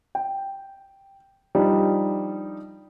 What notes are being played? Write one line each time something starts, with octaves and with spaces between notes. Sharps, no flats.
G5
F3 G3 D4 D#4